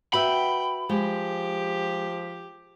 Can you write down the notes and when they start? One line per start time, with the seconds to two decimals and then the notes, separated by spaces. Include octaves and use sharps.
0.13 F#4 B4 E5 G5 B5
0.89 F3 G#3 G4